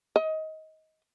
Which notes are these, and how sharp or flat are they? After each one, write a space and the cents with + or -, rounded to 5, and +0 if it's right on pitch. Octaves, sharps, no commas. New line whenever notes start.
D#5 +20